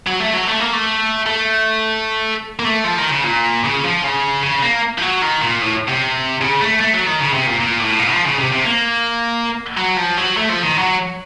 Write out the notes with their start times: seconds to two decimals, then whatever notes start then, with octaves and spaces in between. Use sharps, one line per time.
0.07 F#3
0.20 A3
0.34 F#3
0.47 A3
0.60 A#3
0.73 A3
1.26 A3
2.59 A#3
2.65 A3
2.85 F3
2.98 D#3
3.10 C#3
3.24 A#2
3.64 C#3
3.84 F3
4.04 C#3
4.43 C#3
4.63 A#3
4.98 F3
5.02 F#3
5.22 D#3
5.42 A#2
5.62 A2
5.88 C3
6.41 C#3
6.61 A3
6.80 A3
6.93 F#3
7.07 D#3
7.20 C#3
7.33 C3
7.46 A#2
7.60 A#2
7.80 A2
7.99 A#2
8.12 F3
8.26 C#3
8.39 C3
8.52 C3
8.65 A#3
9.78 F#3
9.97 F3
10.17 F#3
10.37 A3
10.49 F3
10.63 D#3
10.77 F#3